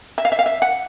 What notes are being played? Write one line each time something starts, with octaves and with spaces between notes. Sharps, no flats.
E5
F5
E5
F5
E5
F#5